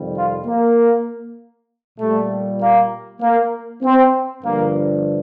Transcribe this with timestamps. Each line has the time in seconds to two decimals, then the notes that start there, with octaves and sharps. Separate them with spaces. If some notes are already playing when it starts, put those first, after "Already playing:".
Already playing: F2 C3 D#3 G3
0.15 F4
0.46 A#3
1.99 A#2 G3 A3
2.60 A#3
3.21 A#3
3.83 C4
4.43 G2 D3 F3 A#3